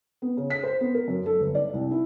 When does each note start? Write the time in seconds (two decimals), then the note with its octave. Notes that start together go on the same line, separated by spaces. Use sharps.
0.22 B3
0.37 C#3
0.50 B6
0.63 C5
0.81 B3
0.94 A#4
1.08 F#2
1.26 A4
1.40 G1
1.55 D5
1.73 C2
1.91 E4